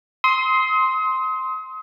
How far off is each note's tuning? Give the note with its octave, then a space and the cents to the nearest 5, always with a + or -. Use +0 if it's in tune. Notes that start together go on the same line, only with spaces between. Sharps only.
C6 +0 D#6 +40